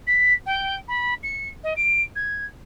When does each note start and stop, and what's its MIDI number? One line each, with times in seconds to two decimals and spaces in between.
0.07 0.33 95
0.46 0.74 79
0.88 1.14 83
1.23 1.48 97
1.63 1.73 75
1.76 2.02 98
2.15 2.45 92